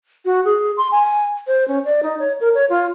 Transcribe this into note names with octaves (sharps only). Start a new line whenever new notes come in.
F#4
G#4
C6
G#5
C5
C#4
D5
D#4
C#5
A#4
C#5
F4